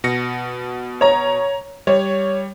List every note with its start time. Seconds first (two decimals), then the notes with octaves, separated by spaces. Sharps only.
0.04 B2 A#6 C#7
1.01 C#5 A#5
1.87 G3 C#5